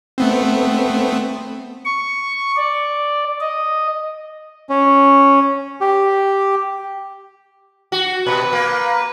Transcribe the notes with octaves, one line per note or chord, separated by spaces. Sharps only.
A3 B3 C4
C#6
D5
D#5
C#4
G4
F#4
B2 B4
A#3